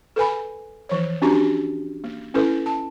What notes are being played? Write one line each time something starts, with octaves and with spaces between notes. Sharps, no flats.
A4 B4 G#5 B5
E3 F3 C5 C#5
C#4 D4 F#4 G4 A#5
A#3
C#4 E4 A4 B4
A5